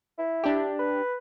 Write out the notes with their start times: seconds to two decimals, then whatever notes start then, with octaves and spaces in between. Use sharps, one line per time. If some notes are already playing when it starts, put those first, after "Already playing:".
0.18 E4
0.44 D4 G4
0.79 B4